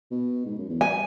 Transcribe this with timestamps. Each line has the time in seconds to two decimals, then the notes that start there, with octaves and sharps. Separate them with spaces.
0.11 B2
0.46 G#2
0.58 F#2
0.69 E2
0.81 G#5